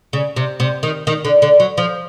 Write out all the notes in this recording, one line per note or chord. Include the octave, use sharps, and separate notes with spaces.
C#3
C3
C3
D#3
D#3
D3
D3
F#3
F3